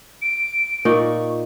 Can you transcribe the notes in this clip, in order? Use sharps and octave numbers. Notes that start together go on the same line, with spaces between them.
D7
A#2 D#4 D5 C#6